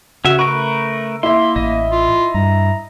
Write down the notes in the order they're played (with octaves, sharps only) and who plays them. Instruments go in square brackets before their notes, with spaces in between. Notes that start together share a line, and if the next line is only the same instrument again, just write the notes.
[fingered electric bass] C#3 [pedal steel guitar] C#4 E5 [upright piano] F#4
[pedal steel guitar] A3 A#4 B4 [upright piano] C#6
[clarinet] A#3 [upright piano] E4 E5 [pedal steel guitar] C6
[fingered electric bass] A1 [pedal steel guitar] D#5
[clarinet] F4
[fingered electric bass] G2 [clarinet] A#5